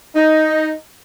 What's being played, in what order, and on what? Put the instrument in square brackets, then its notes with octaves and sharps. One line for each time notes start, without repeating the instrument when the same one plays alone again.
[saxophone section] D#4